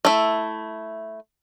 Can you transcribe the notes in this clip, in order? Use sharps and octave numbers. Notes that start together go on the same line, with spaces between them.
A3 E4